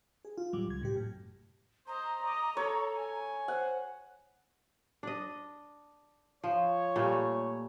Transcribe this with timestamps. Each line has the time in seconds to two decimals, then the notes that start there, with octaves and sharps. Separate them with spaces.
0.25 G#4
0.38 F4
0.53 F2 A2 F#3 G3 D6
0.66 C#2 G#6
0.82 A2 C3 G4
0.95 G#1 F#2 A2
1.87 C5 D#5 A#5
2.25 D#5 D6
2.57 A4 C#5
2.95 G#5
3.48 C5 F#5
5.03 D4 D#5
6.44 F3 C#5
6.96 A#2 G3 A3